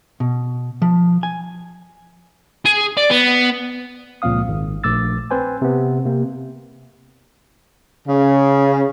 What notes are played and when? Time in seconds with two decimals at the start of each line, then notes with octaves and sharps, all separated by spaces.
0.20 B2
0.82 F3
1.23 G#5
2.66 G#4
2.97 D5
3.10 B3
4.22 C#2 A#2 F3 C4 F5 D#6
4.48 G#1
4.84 A#1 A3 D6 E6 A6
5.31 C4 B4 C5 G#5
5.62 C3 B3
6.05 C3 A#3
8.07 C#3